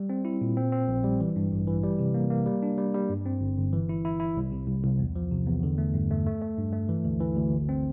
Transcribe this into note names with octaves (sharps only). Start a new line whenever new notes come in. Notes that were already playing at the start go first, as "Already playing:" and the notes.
Already playing: G3
C4
E4
A#2
C4
C4
A#1
G3
E3
G2
A1
E3
G3
C3
A#3
A#3
G3
D4
G3
G3
G2
C4
G1
G1
E3
E4
E4
E4
C2
C3
C2
C2
E2
F3
C3
E2
D3
A3
G2
A3
A3
A3
G2
A3
E3
D2
E3
D2
G1
C4